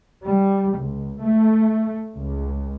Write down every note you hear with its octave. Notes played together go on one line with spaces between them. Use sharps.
G3
C#2
A3
C#2